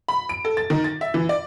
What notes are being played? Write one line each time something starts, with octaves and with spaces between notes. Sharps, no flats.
B5
D7
A4
A6
D#3
A6
E5
E3
D5